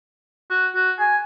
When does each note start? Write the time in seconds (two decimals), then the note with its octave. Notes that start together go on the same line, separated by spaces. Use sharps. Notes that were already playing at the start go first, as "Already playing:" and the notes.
0.50 F#4
0.75 F#4
1.00 G#5